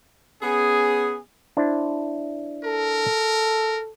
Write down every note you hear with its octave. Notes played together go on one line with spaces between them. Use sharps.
B3 C#4 G#4
D4 E4 C5
A4 A#4